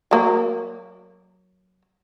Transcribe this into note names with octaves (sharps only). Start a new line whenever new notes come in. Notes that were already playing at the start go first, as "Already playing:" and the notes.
F#3 A#3